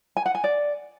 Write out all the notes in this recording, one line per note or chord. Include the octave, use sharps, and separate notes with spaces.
G#5
F#5
G#5
D5